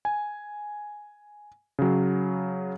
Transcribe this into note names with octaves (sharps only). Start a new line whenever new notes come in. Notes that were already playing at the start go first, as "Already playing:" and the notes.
G#5
C#3 F#3